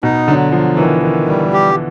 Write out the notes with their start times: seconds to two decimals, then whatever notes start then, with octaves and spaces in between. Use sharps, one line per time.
0.03 B2 D#4
0.28 D3 F#3
0.52 F3 F#3
0.77 D#3 E3
1.02 D#3
1.28 G3
1.53 G4